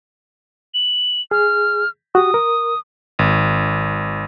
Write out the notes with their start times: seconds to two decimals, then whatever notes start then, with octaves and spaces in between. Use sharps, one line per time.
0.74 F#7
1.31 G#4 F6
2.15 F#4 G4 D#6
2.34 A#4
3.19 G#1